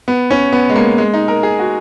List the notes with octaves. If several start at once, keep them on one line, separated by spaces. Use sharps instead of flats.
B3
C#4
B3
G#3
A#3
G#3
D#4
A#4
G#4
F#4